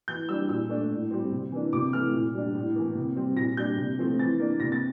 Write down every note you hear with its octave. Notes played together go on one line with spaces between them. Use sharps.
E3 G6
G3 D4 E6
A#2 E6
A3 D4
A2
G3 C4
C3
E3 A#3 D4
C3 D6
E3 A3 F6
A#2
G3 D4
A2
E3 A#3
C3
G3 C4
A#2 A#6
G3 D4 G6
C3
F3 A3 C4
E3 A6
A#3 D4
C3 A#6
A6